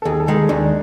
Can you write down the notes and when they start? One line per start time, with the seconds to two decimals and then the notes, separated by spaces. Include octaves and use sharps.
0.02 A4
0.05 D#2 G#4
0.20 A4
0.28 D#3 G#3
0.34 G#4
0.49 D#2 D4